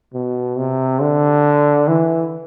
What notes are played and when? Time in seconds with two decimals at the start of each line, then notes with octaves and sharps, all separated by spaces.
0.14 B2
0.58 C3
1.01 D3
1.88 E3